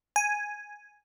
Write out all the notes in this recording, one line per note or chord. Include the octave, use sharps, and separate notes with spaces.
G#5